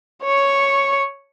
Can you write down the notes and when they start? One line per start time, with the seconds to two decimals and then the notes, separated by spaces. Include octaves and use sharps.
0.24 C#5 C#6